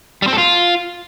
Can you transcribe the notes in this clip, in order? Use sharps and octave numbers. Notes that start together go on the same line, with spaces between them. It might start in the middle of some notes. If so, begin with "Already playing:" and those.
G3
C4
A4
F4